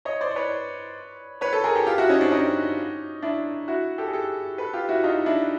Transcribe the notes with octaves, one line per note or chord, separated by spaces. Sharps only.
C#5 D#5
C5 D5
D5
B4 C#5
B4 C#5
A4 B4
G#4 A#4
G4 A4
F4 G4
E4 F#4
C#4 D#4
C4 D4
C#4 D#4
D4 E4
E4 F#4
G4 A4
G#4
G4 A4
A4 B4
F4 G4
E4 F#4
D#4 F4
D4 E4